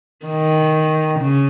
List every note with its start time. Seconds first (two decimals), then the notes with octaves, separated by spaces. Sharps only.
0.26 D#3
1.20 C#3